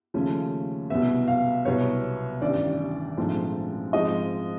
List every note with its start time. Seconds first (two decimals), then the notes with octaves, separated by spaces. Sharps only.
0.14 D#2 C#3 F3 A3 C#4
0.90 C2 B2 F#3 B3 E5
1.28 F5
1.65 C2 B2 F#3 B3 C#5
2.41 A1 G2 D#3 D5
3.17 A#1 G#2 F3 A3 C4
3.93 G#2 F3 G#3 C4 D#5